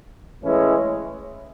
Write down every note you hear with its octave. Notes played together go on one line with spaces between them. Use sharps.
A2 E3 G#3 C#4 E4